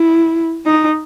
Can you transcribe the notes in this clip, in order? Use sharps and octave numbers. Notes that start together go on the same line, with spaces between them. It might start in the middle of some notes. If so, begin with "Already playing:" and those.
Already playing: E4
D#4